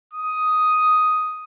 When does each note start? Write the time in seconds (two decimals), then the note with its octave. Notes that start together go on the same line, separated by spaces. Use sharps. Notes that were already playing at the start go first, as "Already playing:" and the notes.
0.13 D#6